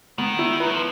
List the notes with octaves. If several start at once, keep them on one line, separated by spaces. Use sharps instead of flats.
D#3 B3
E4
B4
F#3
F3